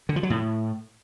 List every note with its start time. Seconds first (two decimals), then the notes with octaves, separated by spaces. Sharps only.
0.09 D3
0.16 F3
0.23 F#3
0.30 A2